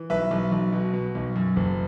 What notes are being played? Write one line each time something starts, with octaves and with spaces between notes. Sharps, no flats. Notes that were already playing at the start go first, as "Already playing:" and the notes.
Already playing: E3
B1 B4 E5
B1
B1
B2
B2
B1
F#2
F#1